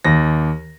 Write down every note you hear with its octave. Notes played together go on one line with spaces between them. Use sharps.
D#2 A#6